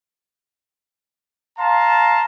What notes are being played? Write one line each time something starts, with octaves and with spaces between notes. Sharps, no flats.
F5 A5 A#5 C6